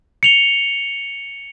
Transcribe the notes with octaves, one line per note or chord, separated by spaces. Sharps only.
C#7 F7 G7